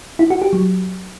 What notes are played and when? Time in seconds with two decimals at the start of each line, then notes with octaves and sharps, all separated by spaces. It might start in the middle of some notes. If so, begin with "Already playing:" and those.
0.19 E4
0.30 F#4
0.42 G4
0.53 F#3